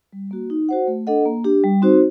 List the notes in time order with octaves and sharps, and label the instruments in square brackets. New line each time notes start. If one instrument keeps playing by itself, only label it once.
[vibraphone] G3
A#3 F#4
D#4
F#4 C5 F#5
A3
D4 A4 D#5 F#5
A#3
D4 G4
G3
C4 D#4 F#4 C5